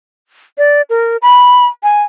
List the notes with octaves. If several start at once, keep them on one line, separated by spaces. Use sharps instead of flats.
D5
A#4
B5
G#5